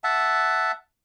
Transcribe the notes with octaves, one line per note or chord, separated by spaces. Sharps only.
E5 F#5 A5